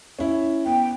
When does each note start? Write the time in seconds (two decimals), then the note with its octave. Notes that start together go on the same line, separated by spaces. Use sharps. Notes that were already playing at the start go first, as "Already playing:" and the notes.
0.19 C#4 E4
0.66 B3 G5